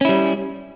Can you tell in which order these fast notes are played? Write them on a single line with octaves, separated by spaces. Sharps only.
C#4 E4 G3